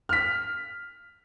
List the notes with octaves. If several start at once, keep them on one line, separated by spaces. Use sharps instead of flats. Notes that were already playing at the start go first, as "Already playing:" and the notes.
F6 B6